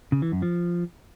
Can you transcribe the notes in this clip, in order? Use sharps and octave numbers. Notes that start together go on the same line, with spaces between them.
C#3
E3
F#2
F3